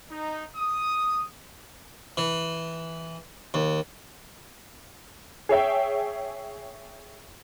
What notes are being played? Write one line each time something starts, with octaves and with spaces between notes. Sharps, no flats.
D#4
D#6
E3
D#2
G#4 C#5 E5 G5